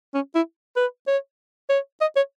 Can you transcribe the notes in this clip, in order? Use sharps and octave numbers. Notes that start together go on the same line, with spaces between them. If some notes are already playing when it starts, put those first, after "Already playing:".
C#4
E4
B4
C#5
C#5
D#5
C#5